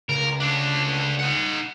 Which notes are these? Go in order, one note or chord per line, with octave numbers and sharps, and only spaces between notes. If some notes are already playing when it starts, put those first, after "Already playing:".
C#2 A#4
A3 D4
D#4 F#5